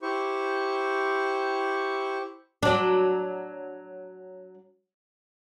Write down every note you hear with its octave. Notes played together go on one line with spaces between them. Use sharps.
E4 G4 C5 C#6
F#3 D4